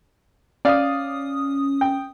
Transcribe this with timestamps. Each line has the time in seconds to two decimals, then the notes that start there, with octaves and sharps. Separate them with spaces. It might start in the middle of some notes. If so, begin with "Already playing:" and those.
0.65 C#4 D5 F5 D#6
1.81 G5